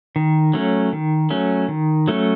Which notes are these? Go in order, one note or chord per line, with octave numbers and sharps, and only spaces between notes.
D#3
F#3 A3 C#4
D#3
F#3 A3 C#4
D#3
F#3 A3 C#4